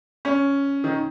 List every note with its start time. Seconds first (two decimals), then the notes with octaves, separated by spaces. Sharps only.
0.25 C#4
0.84 D#3